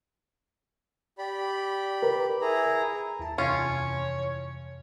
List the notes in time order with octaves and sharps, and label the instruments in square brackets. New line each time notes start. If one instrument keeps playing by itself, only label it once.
[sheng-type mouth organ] G4 D5 B5
[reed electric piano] A#4 B4
[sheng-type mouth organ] E4 G#4 A#5
[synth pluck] D#2 E4 A5
[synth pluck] F2 C3 E3 [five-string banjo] C#4 F4 [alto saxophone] C#5